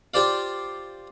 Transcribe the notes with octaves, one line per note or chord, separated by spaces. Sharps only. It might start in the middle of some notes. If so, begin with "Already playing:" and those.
F4 G4 C5 D5 F5